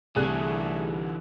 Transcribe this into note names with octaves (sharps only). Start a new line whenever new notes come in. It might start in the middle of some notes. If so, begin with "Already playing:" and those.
C2 D3 E3 A3 G#4 F#6